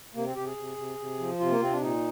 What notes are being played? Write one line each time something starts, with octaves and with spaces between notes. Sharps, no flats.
C3 A#3
C4
C3 G4
G#4
C3
C3
C3
F3
C3 F4
A#3
C3 C4
D4
A#2 D#4